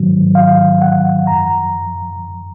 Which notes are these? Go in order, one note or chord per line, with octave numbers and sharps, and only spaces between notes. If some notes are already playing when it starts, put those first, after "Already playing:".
Already playing: G#2 D#3 F#3
F5
F#5
F#2 F3 A#5